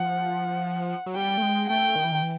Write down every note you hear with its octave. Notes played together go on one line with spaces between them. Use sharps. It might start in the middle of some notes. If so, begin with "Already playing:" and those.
Already playing: F3 F#5
F#3
G3 G5
A3
G#3
A3 G5
D#3
E3
D#3
E3